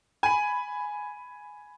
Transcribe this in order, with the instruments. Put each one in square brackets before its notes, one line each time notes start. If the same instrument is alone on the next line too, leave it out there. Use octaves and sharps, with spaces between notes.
[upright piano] G#5 B5